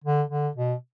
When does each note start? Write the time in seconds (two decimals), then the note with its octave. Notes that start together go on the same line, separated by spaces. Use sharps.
0.04 D3
0.30 D3
0.56 B2